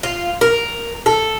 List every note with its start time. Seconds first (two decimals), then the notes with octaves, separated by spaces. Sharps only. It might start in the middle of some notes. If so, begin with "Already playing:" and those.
0.03 F4
0.41 A#4
1.06 A4